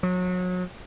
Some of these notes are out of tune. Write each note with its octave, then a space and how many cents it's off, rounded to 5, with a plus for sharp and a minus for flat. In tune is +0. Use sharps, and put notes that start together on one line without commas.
F#3 -30